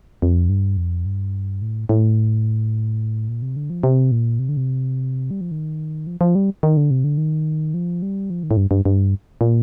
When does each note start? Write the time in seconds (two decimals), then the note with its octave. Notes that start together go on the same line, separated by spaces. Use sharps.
0.22 F2
0.49 G2
0.77 F2
1.06 G2
1.62 A2
1.89 A2
3.29 A#2
3.42 C3
3.56 D3
3.70 F3
3.83 C3
4.11 A#2
4.39 C3
4.49 D3
4.57 C3
5.31 G3
5.41 F3
5.51 D#3
6.07 F3
6.21 F3
6.35 G3
6.63 D#3
6.77 D3
6.91 C3
7.04 D3
7.18 D#3
7.74 F3
8.02 G3
8.30 F3
8.43 D#3
8.51 A2
8.57 G2
8.71 G2
8.85 G2
9.41 A#2